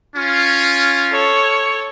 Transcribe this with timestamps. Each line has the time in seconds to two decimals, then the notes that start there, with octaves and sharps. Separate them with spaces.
0.15 C#4 F4
1.12 A4 C#5